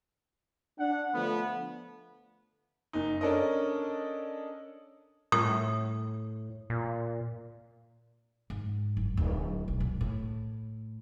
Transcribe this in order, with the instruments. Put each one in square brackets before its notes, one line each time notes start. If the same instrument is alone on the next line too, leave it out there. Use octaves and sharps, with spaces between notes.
[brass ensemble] D4 F#5
D3 F3 A3 B3
[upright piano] F#1 D#4
C#4 D4 A4 A#4 D#5
[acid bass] A2 [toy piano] D#6
[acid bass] A#2
[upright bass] G#2
F#1
D1
B1
A#2
A2